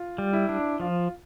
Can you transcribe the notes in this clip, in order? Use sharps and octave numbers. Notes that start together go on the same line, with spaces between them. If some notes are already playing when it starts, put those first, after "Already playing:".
Already playing: F4
G3
E4
D4
F3 F4